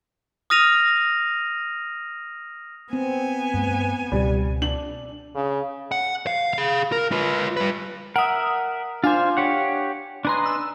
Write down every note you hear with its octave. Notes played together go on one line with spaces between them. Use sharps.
D#6 F6 A#6 D#7 F7
B3 C4 G#5
G2 A3
C#2 B2 G3
D4 F#7
C#3
F#5
F5
G#4 F5
A#4
F4 B4
G3 B4
A#4 E5 F#5 D#6
D4 F4 C5 F5 G#5
G4 C#5 F#5
D4 B4 D#5 G#5 A#5 C6
E6